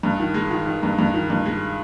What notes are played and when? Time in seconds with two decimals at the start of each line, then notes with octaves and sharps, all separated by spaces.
0.03 G2
0.20 D#3
0.34 G#3
0.51 D#3
0.66 D#3
0.83 G2
0.99 G2
1.14 D#3
1.30 G2
1.45 G#3